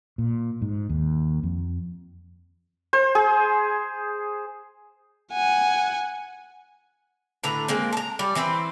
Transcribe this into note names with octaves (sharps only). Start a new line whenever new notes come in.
A#2
G#2
D#2
F2
C5
G#4
F#5 G#5
A2 D3 B4 A#5
G#3 A#3 C4
A5 A#5
G3 D5
E3 C4 B4 C5